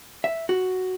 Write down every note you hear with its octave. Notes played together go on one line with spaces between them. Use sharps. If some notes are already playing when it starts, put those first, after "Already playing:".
E5
F#4